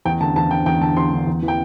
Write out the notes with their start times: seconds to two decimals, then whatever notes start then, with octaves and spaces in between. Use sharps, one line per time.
0.05 E2 G5
0.21 D3 A5
0.36 E2 A5
0.51 D3 G5
0.66 E2 G5
0.81 D3 A5
0.97 E2 C6
1.12 D3
1.27 E2
1.42 E3
1.48 G5